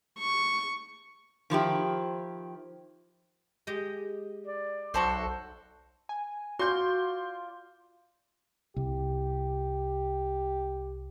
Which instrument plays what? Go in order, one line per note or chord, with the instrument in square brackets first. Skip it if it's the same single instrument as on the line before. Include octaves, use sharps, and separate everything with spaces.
[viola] C#6
[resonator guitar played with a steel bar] D#3 F3 E4 G4
[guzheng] G#3 G4 D#5
[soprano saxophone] D5
[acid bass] B1 [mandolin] F#4 A4 C5
[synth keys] G#5
[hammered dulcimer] F4 D5 [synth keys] F#4 [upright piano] C6 G6
[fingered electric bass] C2 [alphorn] G4